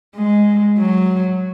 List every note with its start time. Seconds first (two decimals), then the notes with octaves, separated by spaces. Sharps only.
0.16 G#3
0.78 F#3